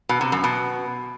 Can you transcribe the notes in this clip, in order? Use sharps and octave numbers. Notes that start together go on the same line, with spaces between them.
B2
C3
F#2
B2